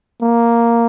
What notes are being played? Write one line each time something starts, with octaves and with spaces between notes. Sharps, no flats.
A#3